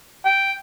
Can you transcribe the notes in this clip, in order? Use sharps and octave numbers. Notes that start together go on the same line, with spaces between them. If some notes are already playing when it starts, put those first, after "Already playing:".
G5